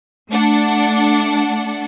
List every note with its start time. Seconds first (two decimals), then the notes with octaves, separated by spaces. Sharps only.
0.31 A3 D4 F#5